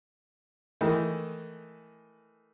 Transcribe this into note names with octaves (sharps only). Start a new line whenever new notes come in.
D#3 E3 G#3 A3